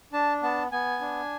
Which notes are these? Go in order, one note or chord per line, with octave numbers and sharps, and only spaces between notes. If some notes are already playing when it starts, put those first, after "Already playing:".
D4 A5
B3 A5
B3 G#5
D4